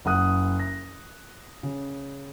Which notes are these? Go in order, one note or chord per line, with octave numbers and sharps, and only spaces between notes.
F#1 F#5 D#6 F#6
A#6
C#3